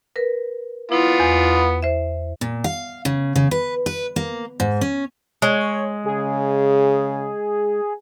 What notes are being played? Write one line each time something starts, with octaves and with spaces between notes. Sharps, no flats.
A#4 B4
B3 E4 F4
E2
C5 E5
A#2
F5
C#3
C#3
B4
B4
A#3
G#2
C#4
G#3 C#5
C#3 G#4